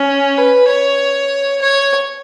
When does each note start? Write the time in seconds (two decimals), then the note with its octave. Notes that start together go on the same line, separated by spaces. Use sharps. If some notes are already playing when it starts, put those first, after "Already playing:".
Already playing: C#4
0.38 B4
0.69 C#5
1.62 C#5